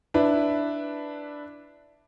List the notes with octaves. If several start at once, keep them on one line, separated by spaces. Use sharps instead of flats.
D4 E4 B4